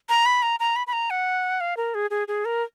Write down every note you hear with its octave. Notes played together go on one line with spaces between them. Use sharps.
A#5
B5
A#5
A#5
B5
B5
A#5
F#5
F5
A#4
G#4
G#4
G#4
A#4